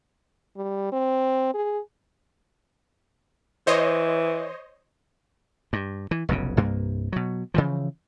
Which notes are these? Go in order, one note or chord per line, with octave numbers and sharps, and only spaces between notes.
G3
C4
G#4
E3 C5 C#5 D#5
G2
E3
F1 B1 F#2 C#3
C2 G2 A#3
B2 F#3
C#3 E3 F3